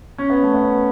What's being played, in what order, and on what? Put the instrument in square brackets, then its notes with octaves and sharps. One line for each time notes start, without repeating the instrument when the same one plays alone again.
[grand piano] C#4
B3
A3
B3